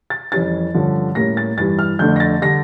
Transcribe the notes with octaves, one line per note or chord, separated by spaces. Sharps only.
A6
F2 E3 G3 C#4 A6
G2 D3 F3 C#4
A2 G3 A#3 C#4 A#6
A6
G2 E3 G3 A6
F6
F2 D3 A3 D4 G6
A#6
A6
D3 G3 A#6